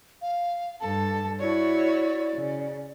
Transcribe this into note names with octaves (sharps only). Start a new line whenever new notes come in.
F5
G2 A4 A5
E4 F#4 C#5 D5
C#3